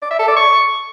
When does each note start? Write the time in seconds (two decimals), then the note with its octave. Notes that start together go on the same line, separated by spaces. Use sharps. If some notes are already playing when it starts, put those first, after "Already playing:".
0.02 D5
0.11 E5
0.19 A4
0.28 D5
0.36 C#6